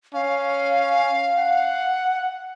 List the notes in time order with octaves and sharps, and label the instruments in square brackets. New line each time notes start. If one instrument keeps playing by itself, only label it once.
[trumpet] C#4 [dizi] F5
[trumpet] F#5